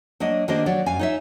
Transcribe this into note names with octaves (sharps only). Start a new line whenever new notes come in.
F#3 A#3 D4 D#5
D#3 A#3 D4 G4 C5 D#5
F#3 C#5 D5
F#2 F5 G#5
D#4 C#5 E5